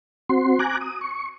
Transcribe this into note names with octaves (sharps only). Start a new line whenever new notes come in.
C4 F#4 C6
G#5 A#5 D6 F#6
D#6
C#6